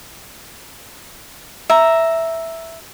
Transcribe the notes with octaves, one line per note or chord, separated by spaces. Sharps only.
E5 A#5